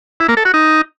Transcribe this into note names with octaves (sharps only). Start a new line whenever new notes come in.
E4
A#3
A4
F#4
D#4